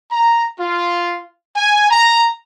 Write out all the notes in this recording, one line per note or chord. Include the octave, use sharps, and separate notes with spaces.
A#5
F4
G#5
A#5